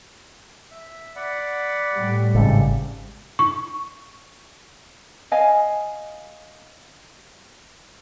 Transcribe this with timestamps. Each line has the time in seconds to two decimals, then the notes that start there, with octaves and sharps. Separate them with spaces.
0.71 E5
1.16 D5 F#5 B5
1.95 A2 G3
2.34 G#1 G#2 C#3 A4
3.39 C#6
5.32 D#5 F5 G#5